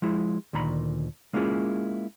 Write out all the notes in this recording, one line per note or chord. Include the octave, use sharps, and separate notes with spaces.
F3 G#3 E4
D2 A#2 D#3 A#5 B5
G#3 A#3 C#4 E4 F4 G#4